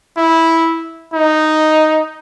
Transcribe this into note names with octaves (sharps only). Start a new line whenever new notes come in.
E4
D#4